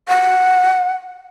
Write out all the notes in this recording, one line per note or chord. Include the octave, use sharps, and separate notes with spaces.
F#5